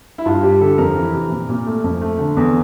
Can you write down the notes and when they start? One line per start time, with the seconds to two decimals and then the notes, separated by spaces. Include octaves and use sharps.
0.18 E4
0.25 G2 F4
0.43 G3 G4
0.61 D3 A4
0.78 F2 A#4
0.95 E3
1.13 C3
1.31 A#2
1.49 A#2
1.66 A3
1.84 F2
2.01 A3
2.19 D3
2.37 E2